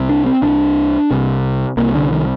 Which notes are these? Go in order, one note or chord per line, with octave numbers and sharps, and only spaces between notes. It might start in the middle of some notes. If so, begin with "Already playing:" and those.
Already playing: C2 C3
D4
C4
C2 C3 D4
C2 C3
C2 C3 A#3
D3
D#3